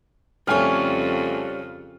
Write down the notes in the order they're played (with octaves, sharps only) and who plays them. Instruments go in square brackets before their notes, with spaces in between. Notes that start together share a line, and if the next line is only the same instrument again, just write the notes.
[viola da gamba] F2 C#3 [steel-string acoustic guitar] G3 C#4 [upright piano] A3 G#5 F6